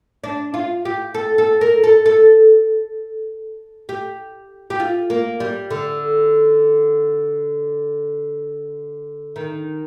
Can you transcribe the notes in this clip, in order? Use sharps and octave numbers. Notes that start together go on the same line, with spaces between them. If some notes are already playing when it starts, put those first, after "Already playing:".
D4
F4
G4
A4
A4
A#4
A4
A4
G4
G4
F4
A#3
G3
D3
D#3